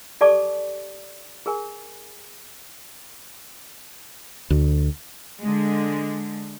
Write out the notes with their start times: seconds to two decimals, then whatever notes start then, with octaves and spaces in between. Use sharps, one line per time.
0.21 G4 A4 D5 A5 C#6 D6
1.46 G#4 A#4 G#5
4.50 D2
5.41 D3 G#3